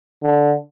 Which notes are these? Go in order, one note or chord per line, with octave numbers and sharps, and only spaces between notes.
D3